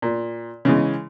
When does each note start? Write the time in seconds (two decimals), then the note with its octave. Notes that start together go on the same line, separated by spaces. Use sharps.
0.02 A#2
0.65 C#3 E3 G#3